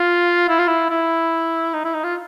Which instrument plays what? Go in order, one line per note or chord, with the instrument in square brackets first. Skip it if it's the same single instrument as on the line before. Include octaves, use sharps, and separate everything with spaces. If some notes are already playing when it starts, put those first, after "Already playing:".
Already playing: [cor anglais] F4
E4
F4
E4
E4
D#4
E4
D#4
F4